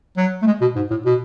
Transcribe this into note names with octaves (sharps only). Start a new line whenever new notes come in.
F#3
A3
G#3
B2
G#2
A2
B2